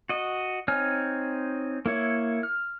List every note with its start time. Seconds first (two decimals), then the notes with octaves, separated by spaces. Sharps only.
0.09 F#4 D#5
0.68 C4 D#4 C#5 G#5 F6
1.86 A#3 E4 C#5
2.43 F6